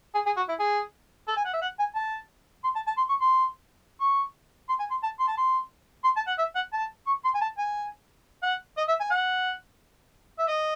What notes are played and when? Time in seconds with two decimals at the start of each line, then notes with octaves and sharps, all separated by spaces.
0.14 G#4
0.26 G#4
0.37 F#4
0.49 E4
0.59 G#4
1.28 A4
1.37 G#5
1.45 F#5
1.54 E5
1.62 F#5
1.79 G#5
1.96 A5
2.64 C6
2.76 A5
2.87 A5
2.98 C6
3.09 C#6
3.21 C6
4.01 C#6
4.69 C6
4.80 G#5
4.91 C6
5.03 A5
5.20 C6
5.28 A5
5.38 C6
6.04 C6
6.17 A5
6.27 F#5
6.39 E5
6.55 F#5
6.73 A5
7.07 C#6
7.25 C6
7.35 G#5
7.41 A5
7.58 G#5
8.43 F#5
8.78 D#5
8.88 E5
9.00 G#5
9.11 F#5
10.39 E5
10.48 D#5